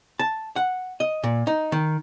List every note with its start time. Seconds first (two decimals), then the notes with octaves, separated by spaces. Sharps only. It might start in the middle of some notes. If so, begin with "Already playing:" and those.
0.19 A5
0.56 F#5
1.00 D#5
1.23 A#2
1.47 D#4
1.72 D#3